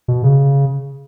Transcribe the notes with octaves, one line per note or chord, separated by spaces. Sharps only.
B2
C#3